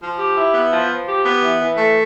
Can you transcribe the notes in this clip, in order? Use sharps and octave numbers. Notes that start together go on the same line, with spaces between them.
F3
G4
E4
B3
F3
F3
G4
B3
E3
E3
A3